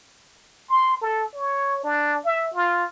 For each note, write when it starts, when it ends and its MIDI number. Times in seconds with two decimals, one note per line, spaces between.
0.70 1.00 84
1.02 1.24 69
1.34 1.84 73
1.84 2.19 62
2.25 2.49 76
2.54 2.85 65